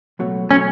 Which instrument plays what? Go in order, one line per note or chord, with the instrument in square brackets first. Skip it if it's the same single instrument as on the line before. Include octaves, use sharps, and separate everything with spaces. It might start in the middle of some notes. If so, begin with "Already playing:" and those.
[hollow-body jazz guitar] C#2 B2 F#3 A3
[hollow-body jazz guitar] B2 F#3 A3 [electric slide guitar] C#4